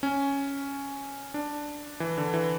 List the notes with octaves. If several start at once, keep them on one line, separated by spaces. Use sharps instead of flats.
C#4
D4
E3
D3
E3